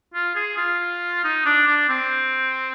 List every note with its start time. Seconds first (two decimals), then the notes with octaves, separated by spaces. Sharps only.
0.14 F4
0.36 G#4
0.58 F4
1.24 D#4
1.46 D4
1.68 D4
1.89 C4